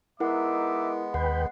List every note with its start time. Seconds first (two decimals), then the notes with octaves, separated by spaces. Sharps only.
0.20 G#3 B3 D#4 E4 A#4 E5 F#5 D6
1.14 D#2 B4 F#5 G5 B5